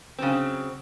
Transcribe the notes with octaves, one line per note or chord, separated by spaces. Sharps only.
C#3 F#3 C4